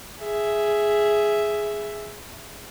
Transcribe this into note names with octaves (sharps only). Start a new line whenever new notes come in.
G#4 E5